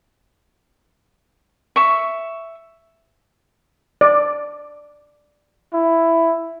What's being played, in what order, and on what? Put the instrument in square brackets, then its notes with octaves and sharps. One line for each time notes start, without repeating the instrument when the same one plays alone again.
[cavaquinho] E5 C#6
[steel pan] D5
[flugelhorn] E4